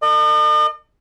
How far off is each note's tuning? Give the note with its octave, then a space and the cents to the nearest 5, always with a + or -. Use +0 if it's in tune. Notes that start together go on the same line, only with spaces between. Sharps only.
A4 +45 D#5 -45